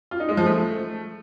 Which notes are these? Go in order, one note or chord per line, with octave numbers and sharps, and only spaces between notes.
F4
D#4
G#3
F3
A3